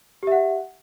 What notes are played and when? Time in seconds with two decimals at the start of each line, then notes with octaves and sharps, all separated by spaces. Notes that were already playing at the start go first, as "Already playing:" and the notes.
0.23 G4
0.27 E5
0.32 F#5